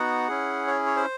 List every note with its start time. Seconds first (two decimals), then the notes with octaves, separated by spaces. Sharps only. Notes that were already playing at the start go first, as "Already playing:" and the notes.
Already playing: B3 D#4 F#4 F#5
0.28 C#4 E4 G#4
0.67 C#5
0.86 C#5
0.96 C5